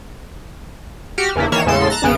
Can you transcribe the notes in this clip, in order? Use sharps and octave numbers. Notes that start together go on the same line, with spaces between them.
F#4 G4 F6
E2 C#3 A#3 D4 E4
D#3 E3 A#3 C#5 E7
E2 A2 C#3 G#3 A4 C6
A5 A#5 F#6 A6 A#6
G1 E2 C#3 B3 D7